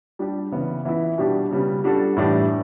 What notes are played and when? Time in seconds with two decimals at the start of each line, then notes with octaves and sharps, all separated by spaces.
0.19 G3 D4 G4
0.52 C#3 E3 B3
0.85 E3 B3 E4
1.18 B2 G3 D4 G4
1.51 C#3 G3 B3
1.84 G3 D4 F#4 A4
2.17 A2 E3 G3 D4